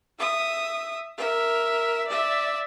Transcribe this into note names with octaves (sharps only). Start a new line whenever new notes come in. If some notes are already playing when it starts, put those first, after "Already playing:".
E5 D#6
A#4 E5
D5 E5